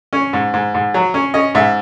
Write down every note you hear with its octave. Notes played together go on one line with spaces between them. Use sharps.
C#4
G#2
G#2
G#2
F#3
C#4
C#4 D#5
G#2 E5